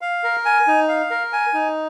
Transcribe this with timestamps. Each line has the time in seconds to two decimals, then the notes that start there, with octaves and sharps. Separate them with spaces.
0.01 F5
0.24 A#4
0.45 G#5
0.67 D#4
0.88 F5
1.10 A#4
1.33 G#5
1.54 D#4